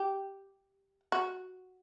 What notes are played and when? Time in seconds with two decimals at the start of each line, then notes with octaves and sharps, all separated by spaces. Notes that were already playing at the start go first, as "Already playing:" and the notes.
Already playing: G4
1.12 F#4